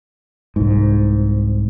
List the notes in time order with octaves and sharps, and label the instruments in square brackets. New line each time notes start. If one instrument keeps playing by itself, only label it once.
[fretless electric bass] C2 G#2